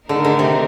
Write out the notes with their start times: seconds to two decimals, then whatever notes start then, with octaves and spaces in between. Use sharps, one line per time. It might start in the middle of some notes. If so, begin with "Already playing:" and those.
0.09 D3 D#3 A3 D#4 A#4
0.25 D3
0.39 C3